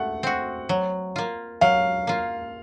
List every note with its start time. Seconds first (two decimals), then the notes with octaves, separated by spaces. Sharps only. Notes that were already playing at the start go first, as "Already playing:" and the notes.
Already playing: A3 F#5
0.23 C4 F#4
0.69 F#3
1.16 A#3 F4
1.61 F#3 F5
2.07 A#3 F4